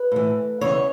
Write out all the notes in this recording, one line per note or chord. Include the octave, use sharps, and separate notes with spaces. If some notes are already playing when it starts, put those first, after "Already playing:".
Already playing: B4
A2 E3
E2 C#3 E3 C#5